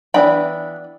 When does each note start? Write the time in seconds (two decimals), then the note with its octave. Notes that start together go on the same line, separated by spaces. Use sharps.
0.14 E3 B3 D4 G5 B5